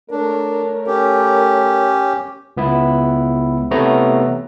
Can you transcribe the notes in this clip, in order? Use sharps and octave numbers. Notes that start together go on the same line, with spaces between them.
A3 D4 A#4 C#5
C#4 G4
C#2 B3 E4
C3 E3 A3 B3 C#5 A#5